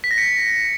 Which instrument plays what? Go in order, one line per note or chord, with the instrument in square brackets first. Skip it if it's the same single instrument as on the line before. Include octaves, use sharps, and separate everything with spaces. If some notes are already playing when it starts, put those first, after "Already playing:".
[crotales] B6
A#6
C#7